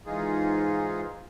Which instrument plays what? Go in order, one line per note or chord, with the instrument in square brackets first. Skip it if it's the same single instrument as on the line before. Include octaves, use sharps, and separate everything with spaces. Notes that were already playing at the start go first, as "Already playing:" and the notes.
[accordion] G#2 E3 D#4 F4 G#4